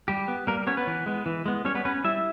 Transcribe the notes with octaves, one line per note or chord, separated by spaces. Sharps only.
G3 G4
B3
G3 A#3 A#4
B3 C#4 C#5
B3 B4
E3
G#3 B3
E3
G#3 B3
G3 C#4 C#5
B3 B4
B3 C#4 B4
G3 E4 E5